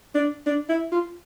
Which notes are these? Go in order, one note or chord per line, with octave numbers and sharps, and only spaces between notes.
D4
D4
E4
F4